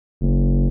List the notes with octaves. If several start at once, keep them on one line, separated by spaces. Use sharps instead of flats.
F#1